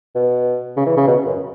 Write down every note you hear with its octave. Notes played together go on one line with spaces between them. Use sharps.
B2
C#3
E3
C#3
B2
F#2